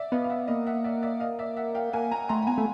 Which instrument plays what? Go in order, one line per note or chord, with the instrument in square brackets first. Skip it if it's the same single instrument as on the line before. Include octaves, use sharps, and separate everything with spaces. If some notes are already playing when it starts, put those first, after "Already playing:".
Already playing: [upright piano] D5 E5
[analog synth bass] B3 [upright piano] D#5 F5
[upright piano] F5
E5 F#5
[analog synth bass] A#3 [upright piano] D#5 F5
[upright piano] E5 F#5
D5 E5
D5 E5
D#5 F5
D5 E5
E5 F#5
F5 G5
[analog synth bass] A#3 [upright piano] F#5 G#5
[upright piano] G#5 A#5
[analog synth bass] A3 [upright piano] A#5 C6
[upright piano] B5
[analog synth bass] B3 [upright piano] G#5 A#5
[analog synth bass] A3